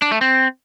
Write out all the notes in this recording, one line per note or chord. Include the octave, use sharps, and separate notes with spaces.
D4
A3
C4